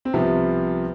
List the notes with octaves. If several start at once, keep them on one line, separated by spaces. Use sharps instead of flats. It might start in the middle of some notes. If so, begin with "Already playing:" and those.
C4
C2 C3 F3 B3